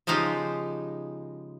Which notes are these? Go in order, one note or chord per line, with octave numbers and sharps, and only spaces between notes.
C#3 F3 G#3 D#4 F4 G4